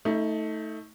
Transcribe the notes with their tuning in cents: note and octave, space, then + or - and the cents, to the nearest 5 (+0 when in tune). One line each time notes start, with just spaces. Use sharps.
A3 +5 D#4 +30